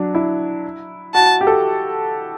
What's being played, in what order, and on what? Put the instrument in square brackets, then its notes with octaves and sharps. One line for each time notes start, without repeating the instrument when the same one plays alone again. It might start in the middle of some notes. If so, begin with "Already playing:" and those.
Already playing: [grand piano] F#3 D4
E4
[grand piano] F#4 [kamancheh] A5
[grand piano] G4
A4